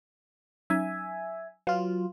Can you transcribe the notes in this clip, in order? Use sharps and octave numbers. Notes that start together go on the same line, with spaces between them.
F#3 C#4 D#4 E5 G#5
F#3 F4 B4 F5